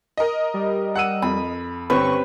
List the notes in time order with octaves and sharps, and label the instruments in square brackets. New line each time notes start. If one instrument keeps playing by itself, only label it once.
[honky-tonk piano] A#4 D#5
[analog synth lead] G3
[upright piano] F#5 E6 D#7
[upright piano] F2 [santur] B5
[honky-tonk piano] G1 [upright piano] C4 C#4 G4 [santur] B4 [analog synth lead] C#6